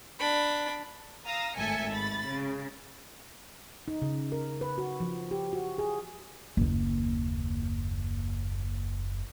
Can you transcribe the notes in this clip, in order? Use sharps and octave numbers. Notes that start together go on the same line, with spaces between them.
D4 B5
F5 A#5 D#6 E6
G#1 A2 A4 E5 G#5 C#7
G#2 B5 A6
C#3
D#4
C#3
A#4
B4
F#4
F3
G4
F#4
G#4
F#1 D#2